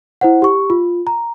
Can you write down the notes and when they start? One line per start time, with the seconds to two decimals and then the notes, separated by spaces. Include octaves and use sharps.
0.21 E4 C5 F#5
0.42 G4 C#6
0.70 F4
1.07 A#5